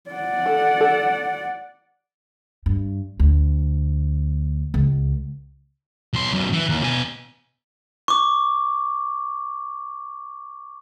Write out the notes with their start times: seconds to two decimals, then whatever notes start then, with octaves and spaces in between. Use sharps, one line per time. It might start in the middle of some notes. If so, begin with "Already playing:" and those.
0.10 D5 F#5
0.46 A4
0.81 A4
2.66 G2
3.20 D2
4.74 C#2
6.13 B1 C6
6.34 F#2 B2
6.53 E3
6.69 D#2
6.83 B2 G#5
8.08 C#6 D6